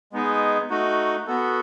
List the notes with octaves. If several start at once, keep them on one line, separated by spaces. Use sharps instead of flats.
G#3 B3 D#4 G#4
A3 D#4 F#4
B3 F#4 A4